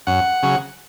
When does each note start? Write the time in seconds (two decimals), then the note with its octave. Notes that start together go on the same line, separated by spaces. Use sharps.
0.07 F#2 F#5
0.43 C#3 F#3